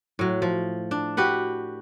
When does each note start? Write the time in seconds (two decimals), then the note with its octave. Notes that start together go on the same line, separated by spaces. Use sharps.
0.19 A2 F#3
0.42 F3
0.91 D4
1.17 F#4 G4 B4 F#5